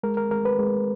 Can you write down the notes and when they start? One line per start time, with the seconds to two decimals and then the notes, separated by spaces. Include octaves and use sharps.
0.03 G#3 A#4
0.17 A#4
0.31 G#3 A#4
0.45 B4
0.59 G#3